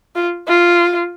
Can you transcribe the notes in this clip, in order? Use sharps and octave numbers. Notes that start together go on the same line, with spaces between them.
F4
F4